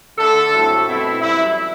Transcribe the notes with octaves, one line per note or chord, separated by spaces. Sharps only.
D3 A3 D4 A4
G2 F#3 A3 C4 E4
B2 A3 C4 E4
F#2 E3 G3 E4